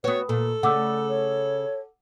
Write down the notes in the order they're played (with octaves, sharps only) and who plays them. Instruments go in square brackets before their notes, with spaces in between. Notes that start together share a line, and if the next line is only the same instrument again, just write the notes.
[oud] B3 F#4 [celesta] B4 D#6 [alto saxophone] C#5
[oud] A#2 [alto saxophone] A4
[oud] C#3 A3 [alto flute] D5 [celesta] F#5 D6 E6
[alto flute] C#5